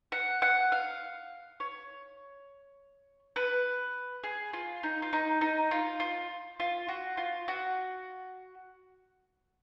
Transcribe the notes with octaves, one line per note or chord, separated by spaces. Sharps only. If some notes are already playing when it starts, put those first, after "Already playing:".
F#5
F#5
F5
C#5
B4
G#4
F4
D#4
F4
D#4
D#4
F4
F4
F4
F#4
F4
F#4